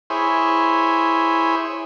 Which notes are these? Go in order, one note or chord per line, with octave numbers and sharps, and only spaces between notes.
E4 G#4 C5 C#5